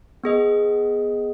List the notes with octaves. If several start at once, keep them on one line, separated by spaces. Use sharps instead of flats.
B3 G#4 D#5